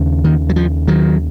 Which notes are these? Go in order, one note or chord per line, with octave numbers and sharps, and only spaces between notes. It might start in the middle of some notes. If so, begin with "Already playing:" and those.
Already playing: D#2 C#3
D#3
F#3
F3
D#3 F#3